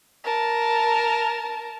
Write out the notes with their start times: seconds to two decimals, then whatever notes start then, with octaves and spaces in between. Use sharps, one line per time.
0.24 A#4 A5